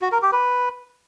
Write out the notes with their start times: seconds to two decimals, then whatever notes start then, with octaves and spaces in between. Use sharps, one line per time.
0.02 F#4
0.12 A#4
0.22 G4
0.32 B4